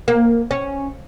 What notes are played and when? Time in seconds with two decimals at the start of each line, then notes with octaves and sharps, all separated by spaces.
0.08 A#3
0.51 C#4